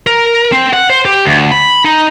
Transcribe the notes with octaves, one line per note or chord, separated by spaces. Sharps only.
A#4
C4
F#5
C5
G4
D2
B5
D#4